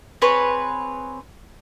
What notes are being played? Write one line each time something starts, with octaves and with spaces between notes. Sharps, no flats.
C4 G#4 B4 C#5